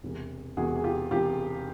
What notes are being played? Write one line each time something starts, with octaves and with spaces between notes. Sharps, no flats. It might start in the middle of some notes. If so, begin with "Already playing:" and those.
E1 E2 C3
E1 E2 C3 F#4 G#4
G#4
F4 G4
E1 E2 C3 F4 G4